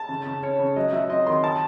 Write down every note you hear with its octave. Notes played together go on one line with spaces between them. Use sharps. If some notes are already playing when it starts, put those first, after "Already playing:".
Already playing: A5
C#3
C#3
C#4 C#5
C#3
F#3 D#5
F#3 E5
C4 D#5
D#3 C6
A5